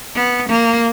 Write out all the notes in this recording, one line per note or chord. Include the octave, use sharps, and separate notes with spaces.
B3
A#3